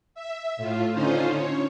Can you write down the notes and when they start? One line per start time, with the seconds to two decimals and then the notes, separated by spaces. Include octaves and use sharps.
0.15 E5
0.57 A2 F4
0.92 D3 C#4 D#4 F4 C5
1.33 C#5